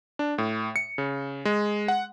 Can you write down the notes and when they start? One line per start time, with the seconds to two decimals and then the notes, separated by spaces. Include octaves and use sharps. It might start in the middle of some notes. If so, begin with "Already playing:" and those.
0.19 D4
0.38 A2
0.76 C#7
0.98 C#3
1.45 G#3
1.88 F#5